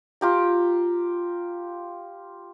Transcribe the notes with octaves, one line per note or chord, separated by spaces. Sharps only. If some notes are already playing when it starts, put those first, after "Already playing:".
F4 G4 A#5